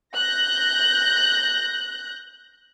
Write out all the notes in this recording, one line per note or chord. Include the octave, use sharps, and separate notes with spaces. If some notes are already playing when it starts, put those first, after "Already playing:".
F#6 G6 A#6